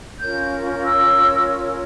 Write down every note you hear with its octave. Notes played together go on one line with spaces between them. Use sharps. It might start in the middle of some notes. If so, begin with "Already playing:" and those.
C#4 F4 A#4 C#5 G6
E6